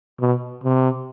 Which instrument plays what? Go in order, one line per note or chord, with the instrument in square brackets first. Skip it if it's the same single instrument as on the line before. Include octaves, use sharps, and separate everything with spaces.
[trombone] B2
C3